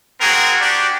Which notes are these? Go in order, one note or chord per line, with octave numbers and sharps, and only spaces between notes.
C4 F#4 G#4 A#4
D4 F#4 G4 D5